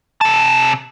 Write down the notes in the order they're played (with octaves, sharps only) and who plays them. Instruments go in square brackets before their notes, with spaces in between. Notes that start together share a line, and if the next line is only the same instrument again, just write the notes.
[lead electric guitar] C3 A5